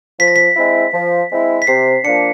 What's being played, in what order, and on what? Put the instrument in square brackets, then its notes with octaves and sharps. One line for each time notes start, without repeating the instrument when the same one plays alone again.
[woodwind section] F3 [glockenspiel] B6
[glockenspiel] A#6
B6
[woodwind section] G#3 C4 E4
F3
G#3 C4 E4
[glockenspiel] B6
[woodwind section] C3 [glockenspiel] C7
[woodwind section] F3 A#3 D4 [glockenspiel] C#7